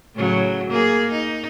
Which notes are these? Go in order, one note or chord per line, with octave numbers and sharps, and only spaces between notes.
A2 C#3 F#3
A#3 G#4
D#4